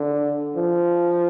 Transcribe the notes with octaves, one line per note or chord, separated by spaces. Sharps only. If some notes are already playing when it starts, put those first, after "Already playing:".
Already playing: D3
F3